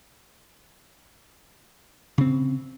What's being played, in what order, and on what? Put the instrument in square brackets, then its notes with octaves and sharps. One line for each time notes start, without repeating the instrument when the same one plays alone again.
[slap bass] C#3 C4